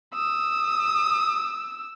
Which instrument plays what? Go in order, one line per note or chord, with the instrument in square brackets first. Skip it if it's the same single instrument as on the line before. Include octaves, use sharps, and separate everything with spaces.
[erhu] D#6 [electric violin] E6